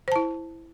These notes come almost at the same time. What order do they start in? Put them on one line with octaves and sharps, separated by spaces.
C5 A5 E4